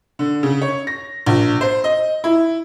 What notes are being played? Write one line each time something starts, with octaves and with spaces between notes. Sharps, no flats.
D3
C#3
C#5
A#6
A#1
C5
D#5
E4